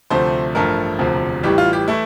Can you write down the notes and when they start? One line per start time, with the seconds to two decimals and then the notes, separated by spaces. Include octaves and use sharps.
0.10 D2 C3 F3 A3 C5
0.55 A1 G2 F3 A3 A#4
0.99 E1 D2 C3 F3
1.43 A1 A2 E3 G3 G4
1.58 F4
1.73 G4
1.88 E3 A3 E4